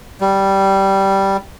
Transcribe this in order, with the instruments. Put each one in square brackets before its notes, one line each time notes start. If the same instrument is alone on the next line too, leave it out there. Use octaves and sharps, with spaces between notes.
[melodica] G3